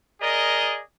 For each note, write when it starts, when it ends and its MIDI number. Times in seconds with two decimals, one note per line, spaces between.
0.21 0.79 68
0.21 0.79 70
0.21 0.79 74
0.21 0.79 75